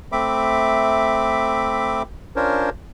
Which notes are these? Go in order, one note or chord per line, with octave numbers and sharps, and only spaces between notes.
A3 C4 E5 B5 D6
C#4 D4 F4 A#4 C5 C#5